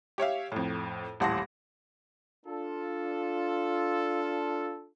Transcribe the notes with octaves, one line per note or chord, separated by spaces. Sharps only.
G4 C#5 E5 F5
F2 A2
D#1 A1 F#5 A5 C6 A#6
D4 F4 A4